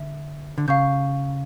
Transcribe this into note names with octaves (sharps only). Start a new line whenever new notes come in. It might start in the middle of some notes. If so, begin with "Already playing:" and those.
Already playing: D3 E5
D3
C#3 F5 C#6 G6